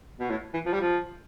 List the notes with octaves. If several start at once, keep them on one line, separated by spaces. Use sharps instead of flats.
B2
A2
E3
F3
G3
F3